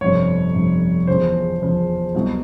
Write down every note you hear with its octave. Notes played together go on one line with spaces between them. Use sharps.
G1 F2 C3 C#5
G1 F2 C3
E2 C#3 F3 C5
E2 C#3 F3
C2 B2 F#3 B3